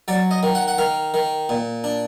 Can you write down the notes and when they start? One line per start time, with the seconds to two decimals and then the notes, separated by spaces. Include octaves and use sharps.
0.08 F#3 D5
0.31 D#5
0.43 D#3
0.55 F#5
0.68 F#5
0.78 D#3 F5
1.14 D#3
1.49 A#2
1.84 D4